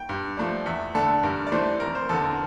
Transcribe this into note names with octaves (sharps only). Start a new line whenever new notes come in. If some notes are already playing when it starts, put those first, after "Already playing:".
Already playing: G5
G2
F3 A3 D4
E2 E5
D3 A3 D4 A4
G2 A#4
D5
E3 A3 D4 C5
F1 A#4
C5
E2 D3 A4
A#4